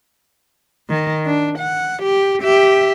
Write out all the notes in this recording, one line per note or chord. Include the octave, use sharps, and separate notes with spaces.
D#3
D4
F#5
G4
G4 E5